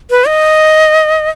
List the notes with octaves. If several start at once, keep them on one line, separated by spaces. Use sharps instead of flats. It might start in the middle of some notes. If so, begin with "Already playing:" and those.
B4
D#5